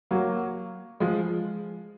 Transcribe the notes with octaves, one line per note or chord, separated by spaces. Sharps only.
F#3 A#3
F3 G#3